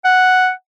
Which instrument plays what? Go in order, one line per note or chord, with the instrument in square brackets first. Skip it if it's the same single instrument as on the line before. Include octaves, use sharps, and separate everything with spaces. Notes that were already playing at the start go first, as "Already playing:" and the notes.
[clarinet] F#5